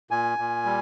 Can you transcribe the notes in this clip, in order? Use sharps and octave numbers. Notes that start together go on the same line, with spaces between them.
A#2 G#5
A#2
G3